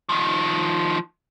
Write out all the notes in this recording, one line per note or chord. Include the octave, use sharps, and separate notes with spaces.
D#3 F3